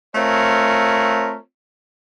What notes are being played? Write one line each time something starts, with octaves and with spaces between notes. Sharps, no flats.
A3 C4 F4 A#4 C#5